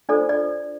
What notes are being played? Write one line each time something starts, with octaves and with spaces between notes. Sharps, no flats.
D4 F4 A4 C5 D5
D5